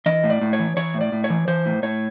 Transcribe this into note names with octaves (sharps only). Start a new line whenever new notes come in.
E3 D#5
A2
D5
A2
C#5
E3
E3 C#5
A2
D5
A2
C#5
E3
E3 C5
A2
A2 C#5